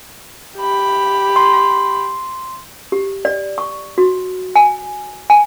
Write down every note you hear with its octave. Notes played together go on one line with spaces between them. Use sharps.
G4 B5
C6
G4
D5
C#6
F#4
G#5
G#5